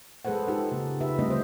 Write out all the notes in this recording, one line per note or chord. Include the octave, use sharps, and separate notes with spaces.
G#3 G#4 A4 B4 C5 F#5
D#4 F4 G4 A4
C#3 A#3
D#4 F4 G4 B4 E5
D3 G3 A3 C4 D4 D#5
C5